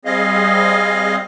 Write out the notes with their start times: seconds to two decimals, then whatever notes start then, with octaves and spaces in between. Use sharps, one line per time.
0.05 G3 C4 G#4 D#5 F5